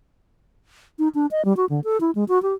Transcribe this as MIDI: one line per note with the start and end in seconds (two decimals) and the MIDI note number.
0.99 1.08 63
1.15 1.26 62
1.31 1.44 75
1.45 1.56 55
1.57 1.65 66
1.69 1.80 50
1.84 2.00 69
2.01 2.11 64
2.15 2.24 56
2.28 2.41 66
2.42 2.54 67